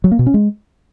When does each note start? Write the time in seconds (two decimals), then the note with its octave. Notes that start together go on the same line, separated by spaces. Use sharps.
0.04 F#3
0.11 A#3
0.19 B2
0.26 C#4
0.34 G#3